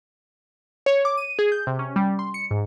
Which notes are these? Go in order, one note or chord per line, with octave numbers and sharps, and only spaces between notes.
C#5
D6
D#7
G#4
G6
C3
C#4
G3
C6
C#7
G#2